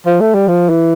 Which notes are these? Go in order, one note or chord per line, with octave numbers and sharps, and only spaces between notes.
F3
A3
G3
F3
E3